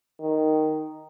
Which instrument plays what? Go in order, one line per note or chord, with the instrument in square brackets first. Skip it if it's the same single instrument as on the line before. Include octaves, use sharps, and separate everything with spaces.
[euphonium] D#3